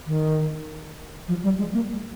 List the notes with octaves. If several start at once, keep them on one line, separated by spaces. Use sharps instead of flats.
D#3
F3
G3
G#3
A#3